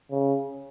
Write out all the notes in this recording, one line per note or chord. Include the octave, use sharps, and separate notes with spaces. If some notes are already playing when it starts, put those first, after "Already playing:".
C#3